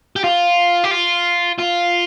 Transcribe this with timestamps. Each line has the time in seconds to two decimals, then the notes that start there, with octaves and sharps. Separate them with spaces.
0.16 G4
0.24 F4
0.84 G4
0.91 F4
1.59 F4